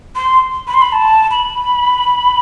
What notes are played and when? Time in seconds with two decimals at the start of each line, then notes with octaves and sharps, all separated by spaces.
0.16 C6
0.67 B5
0.74 C6
0.82 B5
0.92 A5
1.31 B5